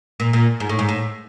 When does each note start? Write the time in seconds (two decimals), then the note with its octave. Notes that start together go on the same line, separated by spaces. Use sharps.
0.20 A#2
0.33 A#2
0.60 G#2
0.69 A2
0.79 G#2
0.89 A2